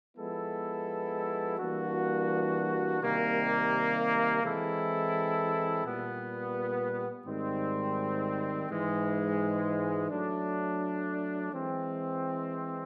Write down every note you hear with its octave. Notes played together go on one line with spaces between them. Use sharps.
F3 G#3 B3 E4 A4
E3 G3 A#3 D4 F#4
C3 D#3 G3 A#3
E3 G#3 C4 E4 A4
A#2 G3 B3
G#2 D#3 G3 C4
G#2 E3 G#3
F#3 A3 D4
E3 G#3 C4